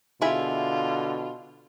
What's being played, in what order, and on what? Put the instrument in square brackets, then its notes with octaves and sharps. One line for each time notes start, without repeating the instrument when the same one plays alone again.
[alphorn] B2 [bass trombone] D3 [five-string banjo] E4 G#4 E5 [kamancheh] F4